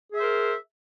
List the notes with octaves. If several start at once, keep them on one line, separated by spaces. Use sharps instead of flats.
G#4 A#4 C5 E5